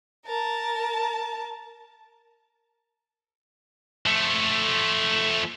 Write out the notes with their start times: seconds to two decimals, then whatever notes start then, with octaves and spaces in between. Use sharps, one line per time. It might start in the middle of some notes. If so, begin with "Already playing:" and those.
0.25 A#4 A5
4.06 F3 A3